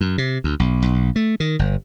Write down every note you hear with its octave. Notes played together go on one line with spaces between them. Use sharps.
F#2
C3
D2
B1
B1
A3
D#3
G1